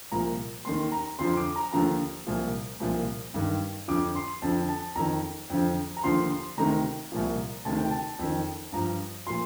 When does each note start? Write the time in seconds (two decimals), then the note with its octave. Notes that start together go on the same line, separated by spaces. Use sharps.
0.12 C2 A#2 F3 A#5
0.65 D#2 D#3 C6
0.92 A#5
1.19 F2 D3 F3 C6
1.37 D6
1.56 A#5
1.73 D#2 D3 F3 A#5
2.27 C2 A#2 F3
2.80 C2 A#2 F3
3.34 G2 D#3
3.88 F2 D3 F3 D6
4.15 C6
4.42 F2 D3 F3 A5
4.69 A5
4.96 F2 D#3 A#5
5.50 F2 D3 F3
5.97 A#5
6.04 D#2 D3 F3 C6
6.30 C6
6.57 D2 C3 D#3 A#5
7.12 C2 A#2 F3
7.65 D2 C3 D#3 A5
7.78 G5
7.91 A5
8.19 F2 D#3
8.72 G2 F3 A#5
9.27 A#2 F3 C6